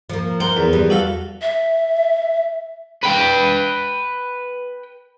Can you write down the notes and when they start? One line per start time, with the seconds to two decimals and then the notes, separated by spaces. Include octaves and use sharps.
0.10 F3 A#3
0.40 A#4 C5 F#5 C6
0.57 E2
0.73 G3 B3
0.90 F#4 A4 F5
1.42 E5
3.03 B4 G5